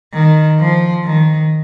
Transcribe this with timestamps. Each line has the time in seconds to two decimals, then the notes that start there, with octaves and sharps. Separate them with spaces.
0.13 D#3
0.60 F3
1.04 D#3